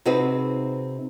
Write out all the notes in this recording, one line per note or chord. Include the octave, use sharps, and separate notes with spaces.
C3 C4 D#4 F#4 G#4 B4